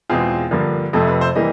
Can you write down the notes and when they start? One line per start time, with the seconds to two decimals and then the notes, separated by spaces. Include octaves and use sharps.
0.09 E2 B2 G#3 C4 F4 G#4
0.51 G2 D3 F3 A#3
0.93 F2 C3 F3 A3 A4
1.07 B4
1.21 C5
1.36 E3 G3 A#3 D#5